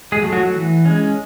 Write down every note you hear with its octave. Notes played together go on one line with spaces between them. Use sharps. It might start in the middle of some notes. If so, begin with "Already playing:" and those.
G#3 G#4
F#3
A3
F#3 F#4
E3
G#3 C#4